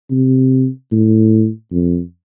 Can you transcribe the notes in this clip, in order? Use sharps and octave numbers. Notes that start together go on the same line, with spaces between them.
C3
A2
F2